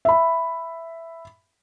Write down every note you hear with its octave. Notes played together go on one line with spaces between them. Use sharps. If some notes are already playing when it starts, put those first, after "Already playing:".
E5 B5